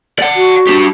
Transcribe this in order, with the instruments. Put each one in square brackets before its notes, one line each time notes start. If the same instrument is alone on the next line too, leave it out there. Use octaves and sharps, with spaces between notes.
[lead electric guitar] D5 F#5
[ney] F#4
[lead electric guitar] D4 G4